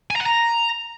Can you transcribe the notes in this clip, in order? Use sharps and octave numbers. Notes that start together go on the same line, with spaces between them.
G#5
A#5
F#5
A#5